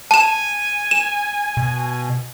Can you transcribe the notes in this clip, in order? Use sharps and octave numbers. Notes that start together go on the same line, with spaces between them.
G#5 A5 E7
E7
B2